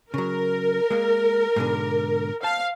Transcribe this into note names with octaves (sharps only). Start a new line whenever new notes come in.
C#3 F#3 A#4
G#3 A#3
G#2 B2 D3
C5 F5 A5